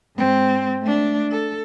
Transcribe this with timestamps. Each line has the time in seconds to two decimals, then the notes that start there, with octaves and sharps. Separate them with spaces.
0.16 G#2 C4
0.82 A3 D4
1.31 A4